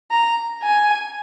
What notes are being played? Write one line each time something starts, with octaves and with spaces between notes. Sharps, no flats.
A#5
G#5